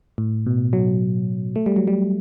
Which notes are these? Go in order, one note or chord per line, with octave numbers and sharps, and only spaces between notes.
A2
B2
F#3
A3
G3
F#3
G3